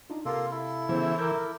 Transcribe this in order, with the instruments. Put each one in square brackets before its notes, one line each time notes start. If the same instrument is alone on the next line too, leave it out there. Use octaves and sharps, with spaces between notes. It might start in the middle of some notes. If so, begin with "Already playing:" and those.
[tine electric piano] D4 D#4 F4
[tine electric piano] C3 F5 [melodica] A#3 F4 A4
[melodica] E4 A4
[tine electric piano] C#3 B3 [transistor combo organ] E3 [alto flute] C5
[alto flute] A#4 [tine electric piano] D6 G6